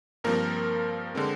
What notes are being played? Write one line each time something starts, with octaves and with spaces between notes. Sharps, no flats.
G2 F3 A#3 C4 A#4
D3 G#3 C4